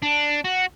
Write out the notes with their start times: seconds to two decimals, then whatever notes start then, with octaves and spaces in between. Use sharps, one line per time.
0.02 D4
0.44 F#4